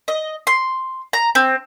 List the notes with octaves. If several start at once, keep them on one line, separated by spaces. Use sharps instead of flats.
D#5
C6
A#5
C4